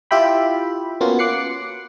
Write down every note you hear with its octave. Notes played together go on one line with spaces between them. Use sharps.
E4 F4 G4 E5 G5 B5
A#3 B3 C#4 F4 F#4
D6 F#6 C7 C#7